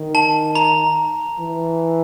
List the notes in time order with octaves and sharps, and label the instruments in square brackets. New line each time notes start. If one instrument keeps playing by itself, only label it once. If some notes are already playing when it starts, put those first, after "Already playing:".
Already playing: [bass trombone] D#3
[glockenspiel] A5
A#5
[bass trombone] E3